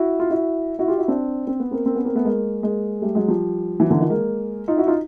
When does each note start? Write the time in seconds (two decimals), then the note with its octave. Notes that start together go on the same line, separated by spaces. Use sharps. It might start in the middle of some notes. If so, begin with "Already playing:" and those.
Already playing: E4 F#4
0.20 F4
0.30 E4 F#4
0.79 E4 F#4
0.88 F4 G4
0.98 E4 F#4
1.08 C4 D4
1.47 C4
1.60 B3
1.71 A#3 C4
1.86 A#3 C4
1.95 B3 C#4
2.05 A#3 C4
2.15 A3 B3
2.25 G#3 A#3
2.63 G#3 A#3
3.02 G3 A3
3.15 F#3 G#3
3.28 F3 G3
3.80 E3 F#3
3.91 D3 E3
3.99 D#3 F3
4.10 G#3 A#3
4.68 D#4 F4
4.77 E4 F#4
4.87 D#4 F4